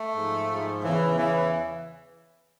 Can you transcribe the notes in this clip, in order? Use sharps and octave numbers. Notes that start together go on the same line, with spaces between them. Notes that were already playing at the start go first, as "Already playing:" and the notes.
Already playing: A3
G#2 F3
G#2 F3
E2 C#3 E3
E2 C#3 E3